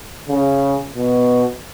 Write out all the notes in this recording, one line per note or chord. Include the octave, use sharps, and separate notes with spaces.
C#3
B2